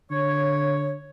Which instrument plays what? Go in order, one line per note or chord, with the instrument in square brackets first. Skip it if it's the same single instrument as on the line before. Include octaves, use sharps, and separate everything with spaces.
[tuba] D3 [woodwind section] C#5